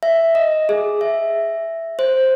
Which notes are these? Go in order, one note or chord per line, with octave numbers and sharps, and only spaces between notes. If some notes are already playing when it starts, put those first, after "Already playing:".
E5
D#5
G#4
E5
C5